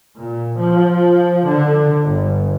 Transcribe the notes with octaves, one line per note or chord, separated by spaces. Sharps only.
A#2
F3
D3
G1